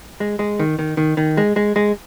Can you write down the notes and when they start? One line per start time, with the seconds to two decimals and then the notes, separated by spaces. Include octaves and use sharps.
0.20 G#3
0.39 G#3
0.59 D#3
0.79 D#3
0.97 D#3
1.17 D#3
1.37 G#3
1.56 G#3
1.76 G#3